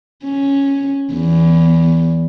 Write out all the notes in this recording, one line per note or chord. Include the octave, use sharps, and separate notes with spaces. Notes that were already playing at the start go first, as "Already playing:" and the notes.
C#4
E2